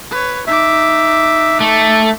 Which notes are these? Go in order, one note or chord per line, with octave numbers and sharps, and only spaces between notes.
B4 C#5
D#4 E5 D6
A3